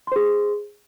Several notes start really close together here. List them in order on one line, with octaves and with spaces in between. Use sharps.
C6 C5 G#4